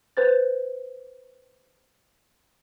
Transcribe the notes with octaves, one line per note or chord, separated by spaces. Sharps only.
B4 C5 A6